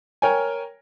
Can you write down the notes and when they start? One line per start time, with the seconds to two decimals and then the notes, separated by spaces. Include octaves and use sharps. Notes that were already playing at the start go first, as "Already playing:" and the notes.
0.22 A#4 C#5 G5 G#5